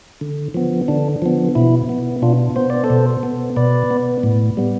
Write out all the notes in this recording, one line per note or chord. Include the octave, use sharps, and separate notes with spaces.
D3
F3 B3
D3 D4
F3 B3
B2 E4
B3
B2 D4 F4
B3 C5
D5
A4 C5
B2
B3
B2 B4 D5
B3
A2
G3 B3